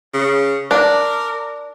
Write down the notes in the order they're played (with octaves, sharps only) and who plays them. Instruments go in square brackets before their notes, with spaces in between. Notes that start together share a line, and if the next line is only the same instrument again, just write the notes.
[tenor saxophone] C#3
[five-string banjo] D4 [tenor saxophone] A#4